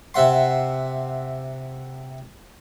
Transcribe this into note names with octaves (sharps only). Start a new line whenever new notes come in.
C3 E5 F#5 C6